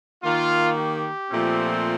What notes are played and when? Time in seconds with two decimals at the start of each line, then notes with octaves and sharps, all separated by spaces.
0.23 D#3 A#3 F4
0.77 G4
1.30 A#2 F3 A3 C4